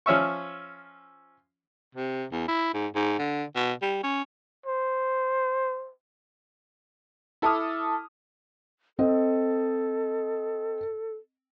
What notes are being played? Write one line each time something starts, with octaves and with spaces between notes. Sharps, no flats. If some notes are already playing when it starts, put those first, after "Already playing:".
F3 C#4 E5 C#6
C3
E2
E4
G#2
G#2
D3
B2
G3
C#4
C5
E4 A4 A5 D6 D#6 F6
C4 A4 D#5